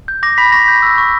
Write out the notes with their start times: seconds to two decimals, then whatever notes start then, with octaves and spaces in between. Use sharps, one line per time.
0.08 G6
0.23 D6 A#6
0.38 B5 B6
0.52 C#6 A#6
0.68 G6
0.83 E6
0.98 C#6